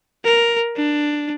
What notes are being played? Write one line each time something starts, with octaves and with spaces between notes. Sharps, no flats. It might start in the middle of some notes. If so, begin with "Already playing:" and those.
A#4
D4